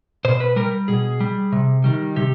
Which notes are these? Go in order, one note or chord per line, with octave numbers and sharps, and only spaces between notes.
B2 C5
B4
G3 A#4
B2 G#4
G3
C3
D#3 G3
C3 G4